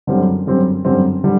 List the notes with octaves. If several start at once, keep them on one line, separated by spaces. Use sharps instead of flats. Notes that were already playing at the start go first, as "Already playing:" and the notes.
F#2 D3 G3 C4
F#2 D3 G3 C4
F#2 D3 G3 C4
D3 G3